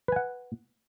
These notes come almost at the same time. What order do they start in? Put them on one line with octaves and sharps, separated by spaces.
B4 G#5 F#5